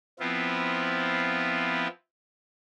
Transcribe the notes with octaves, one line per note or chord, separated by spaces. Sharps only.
F3 B3 C4 E4 F4